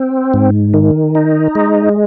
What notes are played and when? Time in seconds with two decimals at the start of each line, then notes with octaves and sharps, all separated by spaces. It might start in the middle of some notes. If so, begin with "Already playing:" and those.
Already playing: C4
0.34 G#2
0.74 D#3
1.15 D#4
1.55 G#3